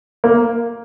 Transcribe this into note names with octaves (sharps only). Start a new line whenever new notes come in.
A#3